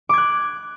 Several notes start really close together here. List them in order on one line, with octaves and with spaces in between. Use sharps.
D6 G#6 F#6